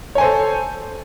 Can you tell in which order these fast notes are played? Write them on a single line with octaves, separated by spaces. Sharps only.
C#5 G#5 C5 A4